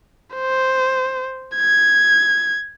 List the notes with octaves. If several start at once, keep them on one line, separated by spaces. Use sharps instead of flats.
C5
G#6